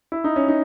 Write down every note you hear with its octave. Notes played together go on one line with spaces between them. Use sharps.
E4
D#4
C#4
D#4